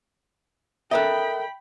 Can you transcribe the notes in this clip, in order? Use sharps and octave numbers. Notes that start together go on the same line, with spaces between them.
A4 A#4 D#5 E5 G5 B5 D#6 F#6